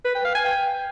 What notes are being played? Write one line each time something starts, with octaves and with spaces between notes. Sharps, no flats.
B4
G5
F5
G#5
G5